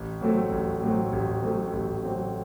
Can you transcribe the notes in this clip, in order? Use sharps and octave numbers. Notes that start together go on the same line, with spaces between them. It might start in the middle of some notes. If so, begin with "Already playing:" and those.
Already playing: A1
A2 F#3 A3 C4
A1
A2 F#3 A3 C4
A1
A2 F#3 A3 C4
A1
A2 F#3 A3 C4